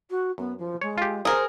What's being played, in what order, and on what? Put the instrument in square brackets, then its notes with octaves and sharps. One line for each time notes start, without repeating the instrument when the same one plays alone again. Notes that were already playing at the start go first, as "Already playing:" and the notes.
[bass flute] F#4
[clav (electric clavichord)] F#2 [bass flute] B3
[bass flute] F3
[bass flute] G#3 [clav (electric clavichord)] C#5
[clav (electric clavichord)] F4 G4
[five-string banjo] G#4 A#4 [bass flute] C5